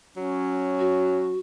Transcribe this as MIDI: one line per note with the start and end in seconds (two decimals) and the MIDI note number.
0.17 1.39 54
0.17 1.37 61
0.79 1.39 66